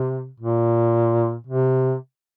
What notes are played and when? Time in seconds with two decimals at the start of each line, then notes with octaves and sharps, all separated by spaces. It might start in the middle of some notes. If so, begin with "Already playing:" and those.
Already playing: C3
0.40 A#2
1.47 C3